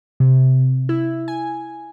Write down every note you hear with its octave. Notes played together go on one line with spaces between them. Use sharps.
C3
E4
G#5